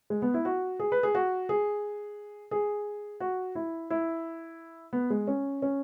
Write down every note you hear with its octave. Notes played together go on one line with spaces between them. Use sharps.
G#3
B3
E4
F#4
G#4
B4
G#4
F#4
G#4
G#4
F#4
E4
E4
B3
G#3
C#4
C#4